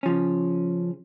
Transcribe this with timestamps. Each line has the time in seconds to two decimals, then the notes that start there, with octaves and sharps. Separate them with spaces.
0.03 C#3 F3 C#4